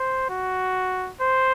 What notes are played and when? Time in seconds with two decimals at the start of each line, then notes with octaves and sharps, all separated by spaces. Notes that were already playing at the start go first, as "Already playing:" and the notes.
Already playing: C5
0.30 F#4
1.21 C5